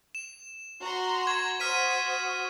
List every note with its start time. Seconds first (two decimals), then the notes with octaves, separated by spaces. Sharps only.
0.15 E7
0.82 F#4 A#5 C6
1.27 C#6 G#6
1.60 F#4 C5 D#6 F6 B6 D#7